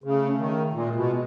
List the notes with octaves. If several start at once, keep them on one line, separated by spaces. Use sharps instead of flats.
C#3 A3
D#3
A#2 G#3
B2